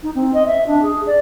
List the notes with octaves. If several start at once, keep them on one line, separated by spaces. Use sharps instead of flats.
D#4
C4
D#5
E5
D4
G#4
D5